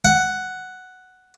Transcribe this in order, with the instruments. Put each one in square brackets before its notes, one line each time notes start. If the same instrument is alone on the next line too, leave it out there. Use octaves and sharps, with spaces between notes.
[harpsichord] F#5